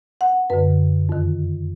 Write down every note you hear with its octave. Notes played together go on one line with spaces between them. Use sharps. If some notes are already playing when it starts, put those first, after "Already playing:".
F#5
F#2 D3 B4
F2 D#3